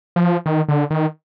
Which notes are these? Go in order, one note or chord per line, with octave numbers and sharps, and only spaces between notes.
F3
D#3
D3
D#3